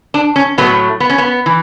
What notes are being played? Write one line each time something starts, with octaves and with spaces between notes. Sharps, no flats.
D4
C#4
A2 F#3 A3 B3
B3
C#4
B3
E3